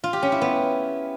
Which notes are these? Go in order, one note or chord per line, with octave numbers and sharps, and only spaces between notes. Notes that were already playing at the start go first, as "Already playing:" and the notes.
F4
G4
C#4
E4
B3